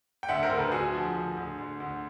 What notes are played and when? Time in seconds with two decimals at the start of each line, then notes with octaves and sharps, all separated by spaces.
0.23 G5
0.28 D2 E5 F#5
0.43 A#4 C5
0.50 D2
0.57 A4 B4
0.72 D2 F#4 G#4
0.94 F3
1.16 D2
1.37 D2
1.58 D2
1.80 D2